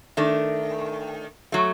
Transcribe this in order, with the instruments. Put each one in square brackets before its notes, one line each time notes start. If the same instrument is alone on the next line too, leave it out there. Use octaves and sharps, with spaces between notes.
[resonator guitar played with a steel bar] D#3 A3 D4
F#3 A3